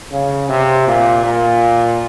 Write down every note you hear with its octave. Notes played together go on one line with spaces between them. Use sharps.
C#3
C3
A#2
A#2